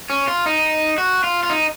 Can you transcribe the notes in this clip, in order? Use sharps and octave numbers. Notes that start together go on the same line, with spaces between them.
C#4
F4
D#4
F#4
F4
F4
D#4